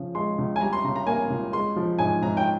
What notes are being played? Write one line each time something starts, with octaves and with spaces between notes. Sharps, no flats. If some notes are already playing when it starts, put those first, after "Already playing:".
Already playing: C#3 F3
G#3 C6
C#2
G#5
G3 A#5
C6
C#3 A#5
A#5
A#3 G#5
C#2
G#3 C6
F3
G#2 G#5
G#2 A#5
G5